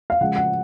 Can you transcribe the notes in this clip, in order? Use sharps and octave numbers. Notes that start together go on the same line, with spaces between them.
F5
C#3 F3 G#3 F#5
F#5